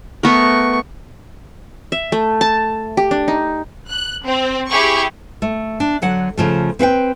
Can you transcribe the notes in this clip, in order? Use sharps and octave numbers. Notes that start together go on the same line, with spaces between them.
A3 B3 A#4 C#6
E5
A3
A5
G4
D4
D#4
F#6
C4
E4 G4 G#4 C#6
A3
D4
D3 F#3 F#5
C#3 F3 A3
C4 B4 F5 G5